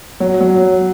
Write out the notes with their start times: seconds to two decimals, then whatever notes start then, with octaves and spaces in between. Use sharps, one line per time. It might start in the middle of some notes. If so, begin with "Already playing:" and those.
0.20 F#3
0.41 F#3